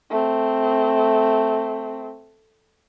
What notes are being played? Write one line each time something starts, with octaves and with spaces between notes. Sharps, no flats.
A3 C4